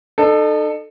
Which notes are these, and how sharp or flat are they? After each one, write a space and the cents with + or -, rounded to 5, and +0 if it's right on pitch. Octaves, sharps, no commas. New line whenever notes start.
D#4 -40 A4 +0